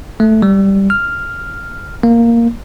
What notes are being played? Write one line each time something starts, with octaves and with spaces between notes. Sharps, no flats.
A3
G3
F6
A#3